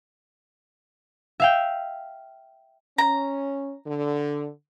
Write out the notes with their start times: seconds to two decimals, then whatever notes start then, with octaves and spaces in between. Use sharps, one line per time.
1.40 E5 F5 G5
2.98 C#4 A#5
3.87 D3